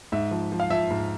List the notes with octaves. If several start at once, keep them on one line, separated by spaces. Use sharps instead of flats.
G#2 E5
F3
F3
F5
F3 E5
G#2